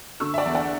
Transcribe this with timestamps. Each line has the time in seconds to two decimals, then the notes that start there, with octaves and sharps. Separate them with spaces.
0.20 D3 C#6 E6
0.34 E5
0.38 D5 F#5
0.46 E2
0.55 D5 F#5